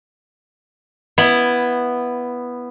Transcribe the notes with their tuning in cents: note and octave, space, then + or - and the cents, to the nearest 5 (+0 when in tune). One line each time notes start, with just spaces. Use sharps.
B3 -5 E4 +5